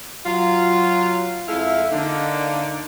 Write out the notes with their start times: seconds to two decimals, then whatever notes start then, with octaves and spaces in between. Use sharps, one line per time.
0.26 F#3 F4
1.48 F2 G#3 E4 A4 E5 F5
1.92 D3 A#3 D#4